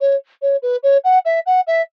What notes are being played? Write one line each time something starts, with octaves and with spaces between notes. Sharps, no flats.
C#5
C#5
B4
C#5
F#5
E5
F#5
E5